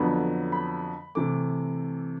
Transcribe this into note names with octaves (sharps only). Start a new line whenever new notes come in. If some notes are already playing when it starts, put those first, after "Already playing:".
Already playing: F2 D3 F#3 B3 B5
B5
C3 E3 A3 D6